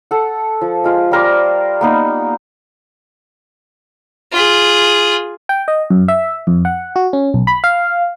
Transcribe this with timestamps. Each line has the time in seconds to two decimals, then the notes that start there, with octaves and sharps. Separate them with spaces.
0.11 A4 F#5
0.61 F3
0.84 G#3 F4
1.11 G3 A#4 C5 D5
1.81 A#3 B3 D#4
4.32 F4 G#4
5.49 G5
5.68 D#5
5.90 F#2
6.08 E5
6.47 F2
6.65 F#5
6.96 F#4
7.13 C#4
7.34 B1
7.47 B5
7.64 F5